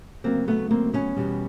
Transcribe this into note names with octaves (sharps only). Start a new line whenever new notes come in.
D2 C#3 F#3 A#3 C4
A3 B3
A#3 C4
B3 C#4
E2 B2 G3